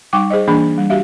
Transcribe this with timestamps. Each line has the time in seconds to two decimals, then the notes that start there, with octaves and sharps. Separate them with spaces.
0.13 G3 D#4 G5 C#6 D6
0.30 G#4 C5 D#5
0.47 E3 A#3 D4 G#4 F#5 B5
0.78 G3
0.90 F#4 G4 E5 F5